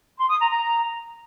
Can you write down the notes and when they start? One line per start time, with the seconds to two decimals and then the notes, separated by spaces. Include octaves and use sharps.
0.19 C6
0.29 D#6
0.39 A#5
0.49 A#5